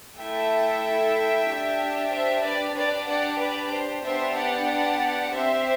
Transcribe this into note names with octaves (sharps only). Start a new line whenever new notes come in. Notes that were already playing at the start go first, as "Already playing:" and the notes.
A3 E4 A4 E5 G5
D4 G4
C5 E5
B4 D5
D4 G4 B4 D5
D5 F#5
B4 D5
C5
B3 D4 G4 C5 E5
D5 F#5
C4 G4 C5 E5